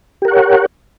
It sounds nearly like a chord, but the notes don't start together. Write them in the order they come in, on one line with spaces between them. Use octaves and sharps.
G4 A#4 F#5 C#5